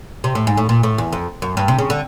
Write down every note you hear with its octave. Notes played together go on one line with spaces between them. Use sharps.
C3
A2
G#2
A2
A#2
A2
E2
F2
F#2
G2
C3
C#3
D3